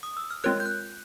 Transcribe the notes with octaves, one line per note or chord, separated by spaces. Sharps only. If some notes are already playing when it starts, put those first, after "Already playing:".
D#6
E6
F6
G#3 C4 F4 A#4 C#5 F#6
G6
F#6